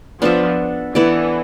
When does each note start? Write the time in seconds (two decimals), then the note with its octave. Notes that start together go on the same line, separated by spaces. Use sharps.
0.22 F3 B3 D4 A4 E5
0.95 E3 B3 E4 A4 D5